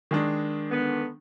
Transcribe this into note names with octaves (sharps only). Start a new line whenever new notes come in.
D#3 G#3 D4
D3 B3